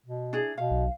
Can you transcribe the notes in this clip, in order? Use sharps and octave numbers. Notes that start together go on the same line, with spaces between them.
B2
D4 E4 G#4
B2 F5
B1